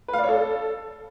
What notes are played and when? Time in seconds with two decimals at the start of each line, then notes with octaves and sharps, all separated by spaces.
0.08 B4
0.13 F5
0.19 D5
0.24 C#5
0.29 A4